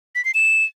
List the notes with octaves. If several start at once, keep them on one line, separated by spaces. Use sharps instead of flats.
B6
C7
E7